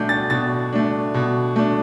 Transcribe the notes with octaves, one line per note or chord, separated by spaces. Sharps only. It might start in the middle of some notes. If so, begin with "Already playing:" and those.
Already playing: B2 A3 D4 G6
A6
B2 A6
A3 D4
B2
A3 D4